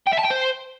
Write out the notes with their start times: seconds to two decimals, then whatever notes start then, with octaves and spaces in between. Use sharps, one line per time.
0.07 G5
0.13 E5
0.19 A5
0.24 G5
0.30 C5